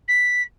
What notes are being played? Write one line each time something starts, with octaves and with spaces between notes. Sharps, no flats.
B6